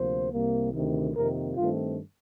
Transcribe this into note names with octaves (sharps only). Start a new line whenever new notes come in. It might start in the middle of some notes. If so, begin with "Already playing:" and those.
Already playing: D2 C3 F3 A#3 C5
C2 C3 G3 A#3
D2 C3 D#3
F2 C3 D#3 A#3 A#4
G2 D#3 A3 C4 F4